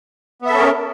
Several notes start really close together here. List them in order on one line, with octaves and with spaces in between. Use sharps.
B3 E5 A4 C#4 A#4